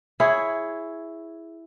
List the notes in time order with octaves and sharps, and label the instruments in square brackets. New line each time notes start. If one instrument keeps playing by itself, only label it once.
[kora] E4 G#4 C#5